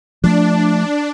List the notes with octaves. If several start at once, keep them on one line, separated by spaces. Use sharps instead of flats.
F3 A3 D4